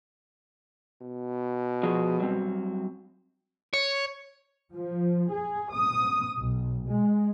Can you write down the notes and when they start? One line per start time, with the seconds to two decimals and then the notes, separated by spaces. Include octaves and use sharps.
1.01 B2
1.83 F3 F#4 G#4
2.20 F#3 G3 C4
3.74 C#5
4.74 F3
5.30 G#4
5.73 D#6
6.37 B1
6.89 G#3